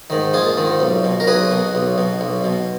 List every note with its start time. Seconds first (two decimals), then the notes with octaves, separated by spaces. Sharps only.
0.10 G#2 D#3
0.34 A#1 F4 G#4
0.57 G#2 D#3
0.80 B1
1.04 B2
1.20 A#4
1.27 B1 G#4 B4
1.51 B2
1.75 B1
1.98 B2
2.21 B1
2.44 B2